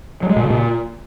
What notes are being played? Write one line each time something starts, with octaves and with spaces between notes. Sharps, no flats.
F#3
G#3
A#2
C#3
A#2